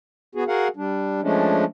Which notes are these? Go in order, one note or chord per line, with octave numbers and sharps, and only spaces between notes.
B3 F#4 G#4
F#4 G#4 A#4 F5 F#5
G3 D4
F3 G#3 A3 C#4 D4